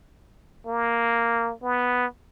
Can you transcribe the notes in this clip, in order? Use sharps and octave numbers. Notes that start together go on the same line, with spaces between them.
A#3
B3